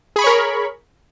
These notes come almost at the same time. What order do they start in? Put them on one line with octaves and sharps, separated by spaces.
G#4 B5 C#6 C#5 A#4